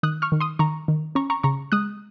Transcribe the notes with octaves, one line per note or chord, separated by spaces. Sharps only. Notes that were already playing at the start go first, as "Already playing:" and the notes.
D#3 D#6 F#6
C#6 F6
D#3
C6 D#6
D#3 A#5 C#6
D#3
C#4 A#5 C#6
A#5 C#6
C#3 A#5 C#6
G#3 D#6 F#6